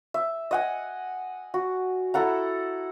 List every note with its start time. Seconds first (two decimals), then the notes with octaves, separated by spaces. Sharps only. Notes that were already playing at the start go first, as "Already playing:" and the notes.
0.14 E5
0.51 D#5 F#5 G#5
1.54 F#4
2.14 E4 A4 F#5 A#5